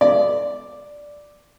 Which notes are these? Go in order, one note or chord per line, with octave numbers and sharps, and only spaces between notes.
D5